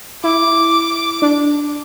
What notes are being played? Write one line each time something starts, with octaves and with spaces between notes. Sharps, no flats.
E4 D6
D4